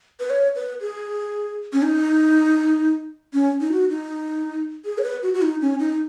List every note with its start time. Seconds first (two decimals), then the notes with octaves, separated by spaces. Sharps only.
0.20 B4
0.30 C#5
0.56 B4
0.81 G#4
1.73 C#4
1.82 D#4
3.33 C#4
3.61 D#4
3.72 F#4
3.90 D#4
4.85 G#4
4.98 C#5
5.04 B4
5.23 F#4
5.34 F#4
5.42 D#4
5.61 C#4
5.80 D#4